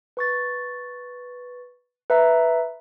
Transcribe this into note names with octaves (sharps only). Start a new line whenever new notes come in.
B4 C#6 A6
B4 E5 A#5